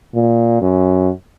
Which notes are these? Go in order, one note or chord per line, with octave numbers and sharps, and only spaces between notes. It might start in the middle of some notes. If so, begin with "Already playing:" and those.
A#2
F#2